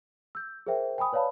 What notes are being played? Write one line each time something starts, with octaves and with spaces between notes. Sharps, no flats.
E6 G6
G#4 A#4 C5 E5 G5
G5 G#5 B5 D#6
B4 C#5 D5 F5 A5 B5